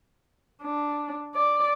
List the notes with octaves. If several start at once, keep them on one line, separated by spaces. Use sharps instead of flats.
D4
D5